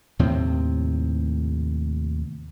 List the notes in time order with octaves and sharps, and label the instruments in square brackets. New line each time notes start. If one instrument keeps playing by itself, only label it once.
[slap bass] D#2 A2 C3 C4